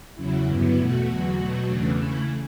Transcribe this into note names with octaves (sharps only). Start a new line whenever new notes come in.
E2 C#3 F#3 E4
G2 D3 F#3 B3 E4
E2 B2 A3 F#4
E2 D3 F#3
B2 F#3 A3
E2 C#3 E3 A3 D4
C#3 E3 A3 E4